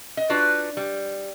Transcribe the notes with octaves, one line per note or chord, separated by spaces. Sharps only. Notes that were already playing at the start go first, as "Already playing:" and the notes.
D#5
D4 F4 F#4 B4
G3